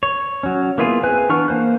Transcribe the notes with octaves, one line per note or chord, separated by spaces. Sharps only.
C#5
F#3 C#4
A#3 B3 E4 F4 G#4
C4 G#4 B4 G#5 F#6
E3 B3 D4 C#6 F6
A#3 C5 F#6